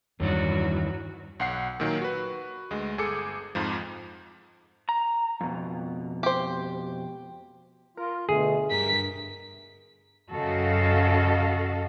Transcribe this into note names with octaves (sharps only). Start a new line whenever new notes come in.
E2 G2 D#3 E3 F#3 F#4 D5
B1 F#5 C7
A#2 D#3 F#3
F#4 B4
D2 G#3
G1 G#4 A4 D6 C#7
F2 G#2 F3
A#5
F2 B2
G4 C5
F4 A#4
B2 D3 A3 G#4
G2 A#4 B6
F#2 C#3 F#4 A4 D#5 F5